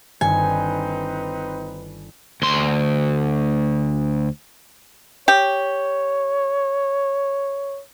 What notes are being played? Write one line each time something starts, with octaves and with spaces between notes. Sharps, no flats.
G1 D#3 C4 D#4 B4 G#5 C#7
D2 C6
G4 C#5